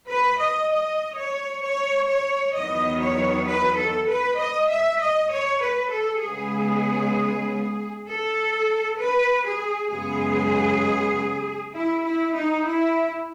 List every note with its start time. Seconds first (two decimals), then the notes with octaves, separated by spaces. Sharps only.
0.09 B4
0.40 D#5
0.70 D#5
1.16 C#5
1.63 C#5
2.08 C#5
2.54 E2 D#3 F#3 B3 D#5
3.00 C#5
3.46 B4
3.77 A4
4.08 B4
4.38 D#5
4.70 E5
5.00 D#5
5.30 C#5
5.61 B4
5.91 A4
6.22 C#3 G#3 B3 G#4
8.06 A4
8.99 B4
9.45 G#4
9.90 F#2 C#3 G#3 B3 G#4
11.75 E4
12.06 E4
12.36 D#4
12.67 E4